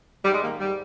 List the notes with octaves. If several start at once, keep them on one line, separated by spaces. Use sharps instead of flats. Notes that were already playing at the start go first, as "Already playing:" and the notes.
G#2 G3
G#3
D#3 A#3
G#2 G3